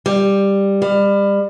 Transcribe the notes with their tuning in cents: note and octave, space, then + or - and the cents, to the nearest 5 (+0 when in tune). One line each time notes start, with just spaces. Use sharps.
G3 +10
G3 +30